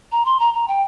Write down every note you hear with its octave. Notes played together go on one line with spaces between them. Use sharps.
A#5
C6
A#5
A#5
G5